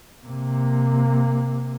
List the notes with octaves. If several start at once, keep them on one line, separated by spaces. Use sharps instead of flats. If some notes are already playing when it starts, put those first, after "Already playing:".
C3 A#3